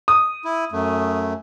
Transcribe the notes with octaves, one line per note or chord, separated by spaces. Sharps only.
D#6
E4
F#2 A3